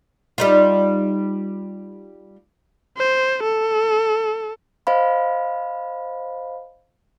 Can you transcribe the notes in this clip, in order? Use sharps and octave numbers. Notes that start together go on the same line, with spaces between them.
G3 D#4 F4
C5
A4
C5 D#5 F5 B5